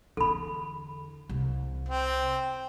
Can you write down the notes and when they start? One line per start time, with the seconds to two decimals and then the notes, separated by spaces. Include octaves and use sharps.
0.17 E2 D3 A4 B5
1.29 C2
1.89 C4